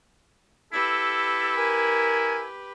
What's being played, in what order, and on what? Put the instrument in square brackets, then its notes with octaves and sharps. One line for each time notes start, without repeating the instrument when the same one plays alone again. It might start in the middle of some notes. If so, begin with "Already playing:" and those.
[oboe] E4 [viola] G4 B4 [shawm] A4
[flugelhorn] A#4 [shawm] G#5